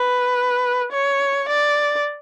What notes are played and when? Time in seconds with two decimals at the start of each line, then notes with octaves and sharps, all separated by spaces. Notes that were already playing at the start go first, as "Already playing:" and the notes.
Already playing: B4
0.92 C#5
1.48 D5